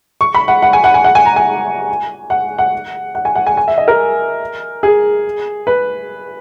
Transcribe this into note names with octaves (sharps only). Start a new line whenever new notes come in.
C#6
B5
F#5
F#5
G#5
F#5
G#5
F#5
G#5
A#5
G#5
F#5
F#5
F#5
G#5
F#5
G#5
G#5
E5
D#5
A#4
G#4
B4